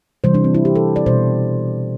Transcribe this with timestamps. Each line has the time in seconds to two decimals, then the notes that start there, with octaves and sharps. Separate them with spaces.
0.24 C3 E3 G3 C5
0.34 D4
0.44 C4
0.55 E4
0.65 G4
0.75 A4
0.96 D5
1.06 B2 G3 C5